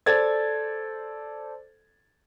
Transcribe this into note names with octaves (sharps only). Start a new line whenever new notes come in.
A4 C5 D5 G#6 A6